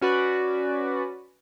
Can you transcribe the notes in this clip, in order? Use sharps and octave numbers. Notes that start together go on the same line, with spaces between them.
C#4 F#4 B4 D5